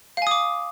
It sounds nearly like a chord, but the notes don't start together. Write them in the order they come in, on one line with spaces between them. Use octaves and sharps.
F5 G#5 D#6 D6